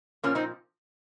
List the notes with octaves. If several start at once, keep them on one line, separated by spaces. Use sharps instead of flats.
A#2 F3 A#3 C#4
C4 D#4